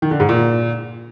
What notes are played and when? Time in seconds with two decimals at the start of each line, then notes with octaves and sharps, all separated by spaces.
0.02 D#3
0.11 D3
0.20 G#2
0.29 A#2